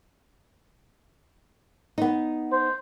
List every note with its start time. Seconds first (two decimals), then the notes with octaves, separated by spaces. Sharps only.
1.98 B3 D#4
2.52 C5